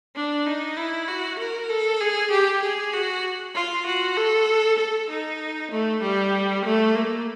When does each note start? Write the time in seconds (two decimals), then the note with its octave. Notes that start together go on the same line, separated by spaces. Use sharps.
0.16 D4
0.47 D#4
0.77 E4
1.08 F#4
1.39 A#4
1.70 A4
2.01 G#4
2.31 G4
2.62 G#4
2.93 F#4
3.55 F4
3.86 F#4
4.17 A4
4.78 A4
5.10 D#4
5.71 A3
6.02 G3
6.65 A3
6.95 A#3